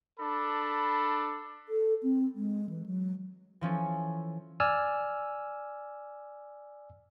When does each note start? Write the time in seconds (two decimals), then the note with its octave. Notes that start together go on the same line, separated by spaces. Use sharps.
0.18 D4 A4 B5
1.69 A4
2.03 C4
2.35 G#3
2.69 E3
2.86 F#3
3.61 E3 F3 C#4 A4
4.60 D5 G#5 E6 F6